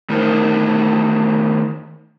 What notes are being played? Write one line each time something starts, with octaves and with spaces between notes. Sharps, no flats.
D#3 A3 D4 D#4 A#4 C5